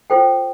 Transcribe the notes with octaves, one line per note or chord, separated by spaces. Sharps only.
F4 A4 C5 G5